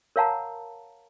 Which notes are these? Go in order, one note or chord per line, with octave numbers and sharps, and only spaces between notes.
A#4 C#5 F5 F#5 A5 A#5